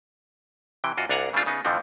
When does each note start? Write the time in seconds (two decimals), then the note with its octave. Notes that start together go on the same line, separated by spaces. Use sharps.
0.84 C3 E3 G5
0.97 F#2 F4 F#4 D#5
1.09 C2 D4 F5 F#5 G#5 A#5
1.33 C#3 G3 A3 D4 F4
1.46 C#3 B3 D#4
1.65 F2 D3 E3 F3 A3 C4